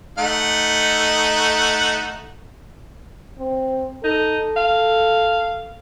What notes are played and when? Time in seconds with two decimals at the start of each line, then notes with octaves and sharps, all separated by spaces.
0.18 A3 D#4 F#5
3.39 C4
4.04 D#4 A4
4.57 F5